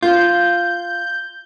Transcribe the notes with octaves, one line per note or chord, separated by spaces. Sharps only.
F4 G6